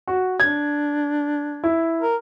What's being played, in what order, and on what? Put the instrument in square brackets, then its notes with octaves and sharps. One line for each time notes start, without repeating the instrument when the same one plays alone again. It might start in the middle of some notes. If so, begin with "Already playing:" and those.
[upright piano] F#4
[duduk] D4 [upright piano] G#6
[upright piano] E4
[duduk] A#4